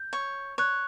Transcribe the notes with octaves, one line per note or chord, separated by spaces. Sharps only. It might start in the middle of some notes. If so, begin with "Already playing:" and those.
Already playing: G6
C#5
C#5 F#6